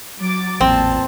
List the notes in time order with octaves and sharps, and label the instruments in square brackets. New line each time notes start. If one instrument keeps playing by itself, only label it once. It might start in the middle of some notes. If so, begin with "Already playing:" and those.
[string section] F#3 D6 A6
[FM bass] A1 [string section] E2 A#2 A5 [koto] C4